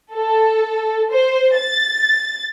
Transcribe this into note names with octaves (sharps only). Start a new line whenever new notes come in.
A4
C5
A6